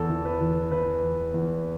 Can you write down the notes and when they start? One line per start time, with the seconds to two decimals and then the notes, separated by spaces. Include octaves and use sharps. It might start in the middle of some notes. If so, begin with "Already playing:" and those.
Already playing: E2 A4
0.10 E3
0.25 B4
0.40 E3
0.71 E3 B4
1.03 E2
1.34 E2